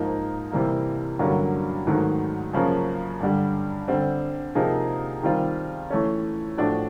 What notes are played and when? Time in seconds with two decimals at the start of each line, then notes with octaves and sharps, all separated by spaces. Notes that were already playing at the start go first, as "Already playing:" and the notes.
Already playing: G#2 F3 A#3 D#4
0.52 C3 E3 G3 A#3
1.19 G2 D3 F#3 A#3 C#4
1.87 G#2 D#3 F#3 A3
2.53 F#2 C#3 F3 A#3 C#4
3.21 G2 D3 G3
3.88 D3 G3 C4
4.55 C3 F3 A#3 D#4 G#4
5.23 D#3 G3 C4 F4
5.90 E3 A3 C#4
6.57 A2 F3 A3 D4 F#4